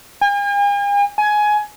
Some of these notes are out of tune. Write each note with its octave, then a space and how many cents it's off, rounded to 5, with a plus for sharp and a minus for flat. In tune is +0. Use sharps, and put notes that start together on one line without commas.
G#5 -45
G#5 +15